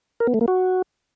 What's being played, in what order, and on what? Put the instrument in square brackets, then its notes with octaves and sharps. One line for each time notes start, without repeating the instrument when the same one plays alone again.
[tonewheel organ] A#4
B3
A3
A#3
F#4